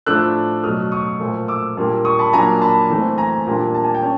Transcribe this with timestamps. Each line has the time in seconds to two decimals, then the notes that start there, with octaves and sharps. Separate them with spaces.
0.06 A2 F3 A3 D4 E6 F#6
0.63 B2 F#3 A3 D#6 F6
0.92 C#6 D#6
1.20 A#2 F3 A3
1.48 D6 E6
1.77 A#2 G3 A#3 D4
2.05 C#6 D#6
2.19 A5 B5
2.33 A#2 F#3 A#3 D4 G#5 A#5
2.62 A5 B5
2.90 E3 A3 C4
3.18 G#5 A#5
3.47 A#2 G3 A#3 D4
3.74 A5
3.84 G#5
3.94 G5 A5
4.03 C#4